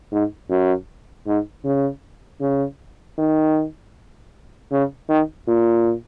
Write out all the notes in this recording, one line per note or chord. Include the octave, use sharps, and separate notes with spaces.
G#2
F#2
G#2
C#3
C#3
D#3
C#3
D#3
A#2